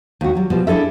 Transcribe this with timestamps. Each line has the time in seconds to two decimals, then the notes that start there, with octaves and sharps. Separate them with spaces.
0.21 D#2 F#4
0.35 F#3 G3
0.50 B2 F3 G3
0.67 D4 E4 G#4 A4 E5